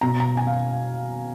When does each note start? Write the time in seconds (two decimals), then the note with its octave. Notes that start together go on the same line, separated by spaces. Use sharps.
0.01 B2 A#5
0.20 A#5
0.37 G#5
0.47 F5